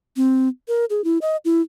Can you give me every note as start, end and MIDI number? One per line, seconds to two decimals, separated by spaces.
0.16 0.48 60
0.68 0.85 70
0.90 1.04 68
1.04 1.18 64
1.22 1.37 75
1.45 1.62 64